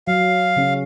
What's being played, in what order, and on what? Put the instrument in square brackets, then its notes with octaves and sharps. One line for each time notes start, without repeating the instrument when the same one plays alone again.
[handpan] F#3 [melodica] F5
[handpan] C#3 C#4